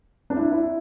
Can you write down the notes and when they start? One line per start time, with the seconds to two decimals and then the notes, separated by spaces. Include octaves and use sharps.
0.30 D4
0.36 E4
0.51 E4